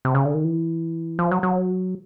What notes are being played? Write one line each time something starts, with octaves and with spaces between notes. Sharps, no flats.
C3
C#3
D3
D#3
E3
F3
F#3
F#3